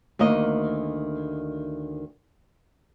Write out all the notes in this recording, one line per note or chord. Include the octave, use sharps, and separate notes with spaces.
D2 D#3 A#3 D#5